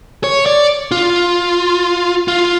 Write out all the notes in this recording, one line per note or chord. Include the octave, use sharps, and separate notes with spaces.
C#5
D5
F4
F4